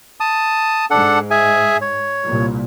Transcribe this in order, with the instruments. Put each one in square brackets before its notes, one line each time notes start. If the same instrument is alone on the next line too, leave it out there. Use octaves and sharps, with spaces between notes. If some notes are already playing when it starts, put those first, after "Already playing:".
[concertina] A5 D#6
[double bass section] G#2 [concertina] D4 A4 F#5
[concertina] G#4 E5 G#5
C#5
[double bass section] C2 A#2